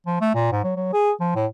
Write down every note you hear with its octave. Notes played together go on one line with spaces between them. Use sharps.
F3
A3
A#2
G#2
F#3
F#3
G#4
F3
A2